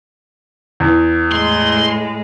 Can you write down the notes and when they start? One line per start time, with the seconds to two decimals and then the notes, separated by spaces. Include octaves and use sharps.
0.80 E2
1.32 A2 G#3 C6